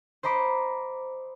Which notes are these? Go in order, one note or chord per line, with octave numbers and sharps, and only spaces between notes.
C5 D#5 A#5 B5 D6